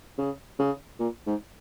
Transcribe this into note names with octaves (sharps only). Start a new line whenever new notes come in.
C#3
C#3
A#2
G#2